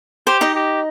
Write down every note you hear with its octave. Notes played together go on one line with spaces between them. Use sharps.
G4 C5
D#4 D#5
G4